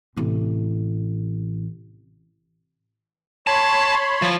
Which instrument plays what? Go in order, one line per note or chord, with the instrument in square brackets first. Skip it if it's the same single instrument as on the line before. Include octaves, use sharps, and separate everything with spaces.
[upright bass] A1 C3
[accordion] C#5 B5 C6 [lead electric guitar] A5
[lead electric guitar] F3